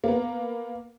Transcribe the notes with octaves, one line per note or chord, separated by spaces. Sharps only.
A#3 B3